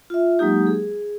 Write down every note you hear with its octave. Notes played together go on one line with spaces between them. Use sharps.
F4 E5
F#3 G#3 A#3 D#4 G4
G#4